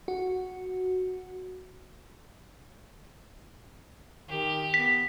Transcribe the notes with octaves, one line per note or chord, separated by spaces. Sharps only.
F#4
D#3 G4
B3 B6